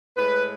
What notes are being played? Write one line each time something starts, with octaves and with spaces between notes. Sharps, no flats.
A2 G#3 B4